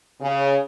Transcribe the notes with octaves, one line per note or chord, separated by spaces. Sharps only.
C#3